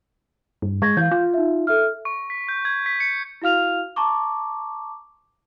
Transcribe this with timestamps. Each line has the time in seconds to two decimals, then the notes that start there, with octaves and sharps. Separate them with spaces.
0.62 G2
0.82 G#3 C#6 G#6 A#6
0.97 E3 F5 G6
1.11 F4
1.34 D#4 E5
1.67 A4 E5 F6
2.05 C#6
2.30 B6
2.49 G6
2.65 G#6
2.86 B6
3.00 C#7
3.42 E4 F#4 F5 F6 F7
3.96 A5 A#5 C#6 D6